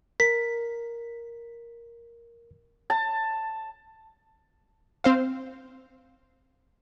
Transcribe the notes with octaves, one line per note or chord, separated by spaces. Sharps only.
A#4 B6
A5
C4 C5 F5